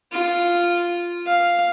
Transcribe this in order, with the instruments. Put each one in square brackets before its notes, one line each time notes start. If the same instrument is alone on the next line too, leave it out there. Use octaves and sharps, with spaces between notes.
[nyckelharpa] F4
F5